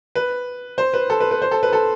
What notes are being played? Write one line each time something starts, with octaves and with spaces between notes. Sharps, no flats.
B4
C5
B4
A4
B4
B4
C5
A4
B4
A4